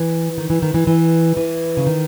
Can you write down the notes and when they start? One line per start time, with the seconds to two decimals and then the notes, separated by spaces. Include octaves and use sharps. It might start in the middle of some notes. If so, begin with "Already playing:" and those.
Already playing: E3
0.38 D#3
0.50 E3
0.62 D#3
0.74 E3
0.87 E3
1.37 E3
1.77 C#3
1.87 D#3